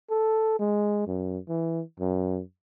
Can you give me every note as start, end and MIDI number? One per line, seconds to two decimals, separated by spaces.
0.10 0.55 69
0.59 1.06 56
1.07 1.38 42
1.49 1.81 52
2.00 2.40 42